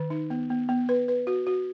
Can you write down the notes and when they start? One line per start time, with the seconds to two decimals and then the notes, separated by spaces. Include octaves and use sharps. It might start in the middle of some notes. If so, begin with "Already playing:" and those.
Already playing: D#3
0.10 D#4
0.30 B3
0.50 B3
0.69 B3
0.89 B4
1.08 B4
1.27 F#4
1.47 F#4